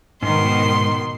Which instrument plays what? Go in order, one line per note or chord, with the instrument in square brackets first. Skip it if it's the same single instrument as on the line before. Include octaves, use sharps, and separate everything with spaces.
[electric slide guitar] G#2 [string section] B2 D#3 [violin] C6